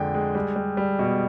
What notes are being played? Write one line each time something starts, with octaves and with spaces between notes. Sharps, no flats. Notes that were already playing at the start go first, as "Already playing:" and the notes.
Already playing: F2 D3 G#3 G5
G#3
G3
G3
G3
B2